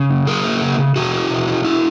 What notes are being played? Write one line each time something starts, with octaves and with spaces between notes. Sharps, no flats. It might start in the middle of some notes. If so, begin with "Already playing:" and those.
Already playing: C#3
F#2
F#3 G#4 A#4
A#3
C#3
C#3
B2 F#4 G#4
E4
B2
E4
E4